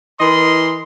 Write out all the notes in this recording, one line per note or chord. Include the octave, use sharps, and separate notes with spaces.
E3 A#4 D#5 C6